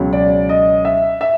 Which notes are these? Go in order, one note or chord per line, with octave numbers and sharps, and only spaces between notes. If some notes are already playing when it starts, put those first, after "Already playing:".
Already playing: C#2 B2 F#3
D5
D#5
E5
E5